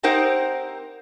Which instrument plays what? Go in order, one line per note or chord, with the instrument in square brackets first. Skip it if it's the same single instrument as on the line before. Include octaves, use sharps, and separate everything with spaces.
[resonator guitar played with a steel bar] C4 D#4 G4 A#4 C5 F#5